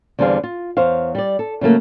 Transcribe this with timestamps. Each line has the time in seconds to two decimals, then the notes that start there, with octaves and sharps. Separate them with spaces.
0.19 E2 D3 G3 C4 G#4 F5
0.44 F4
0.77 E2 C5 C#5 F5
1.15 G3 D5
1.39 A4
1.61 C#3 F#3 A3 A#3